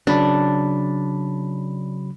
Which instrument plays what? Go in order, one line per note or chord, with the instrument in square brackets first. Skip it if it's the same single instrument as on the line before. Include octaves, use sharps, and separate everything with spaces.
[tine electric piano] C#3 F#3 B5 [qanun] D4